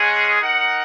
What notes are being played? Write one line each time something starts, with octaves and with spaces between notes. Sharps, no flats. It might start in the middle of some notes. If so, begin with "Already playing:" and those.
Already playing: G#3 C#4 G#4 F#5
D#4 A#4 F#5